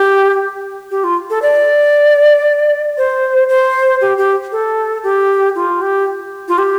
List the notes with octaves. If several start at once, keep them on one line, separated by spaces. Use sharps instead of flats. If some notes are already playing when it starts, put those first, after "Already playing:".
Already playing: G4
G4
F4
A4
D5
C5
C5
G4
G4
A4
G4
F4
G4
F4
G4